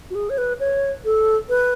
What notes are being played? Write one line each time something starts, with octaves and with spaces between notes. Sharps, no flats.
F#4
G#4
C#5
B4
C#5
A4
B4